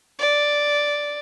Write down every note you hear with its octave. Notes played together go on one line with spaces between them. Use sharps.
D5